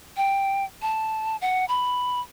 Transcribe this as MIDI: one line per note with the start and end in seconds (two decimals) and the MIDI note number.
0.17 0.64 79
0.82 1.37 81
1.41 1.65 78
1.68 2.20 83